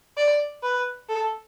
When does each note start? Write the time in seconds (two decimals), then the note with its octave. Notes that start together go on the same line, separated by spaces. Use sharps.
0.17 D5
0.63 B4
1.09 A4